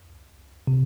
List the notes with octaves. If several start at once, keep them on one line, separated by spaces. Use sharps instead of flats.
C3